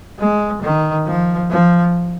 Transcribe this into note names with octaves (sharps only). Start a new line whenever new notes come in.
G#3
D#3
F3
F3